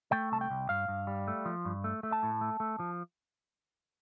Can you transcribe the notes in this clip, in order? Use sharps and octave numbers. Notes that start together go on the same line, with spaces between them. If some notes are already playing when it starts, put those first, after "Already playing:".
A3 G5
C2 A5
G5
C2
G2 F5
G2
G3
A3
F3
G2
A3
A3
A5
A2
A3
A3
F3